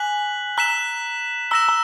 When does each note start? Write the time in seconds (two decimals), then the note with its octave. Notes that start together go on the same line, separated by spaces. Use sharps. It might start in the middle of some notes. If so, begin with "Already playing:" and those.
Already playing: G#5 F#6 B6 F#7
0.58 A#5 F#6 B6 E7
1.51 A#5 E6 A#6 E7
1.69 A#5